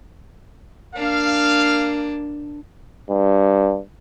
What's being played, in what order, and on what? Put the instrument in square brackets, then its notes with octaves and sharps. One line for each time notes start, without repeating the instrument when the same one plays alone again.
[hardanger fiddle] A#3 D4 [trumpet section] F5
[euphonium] G2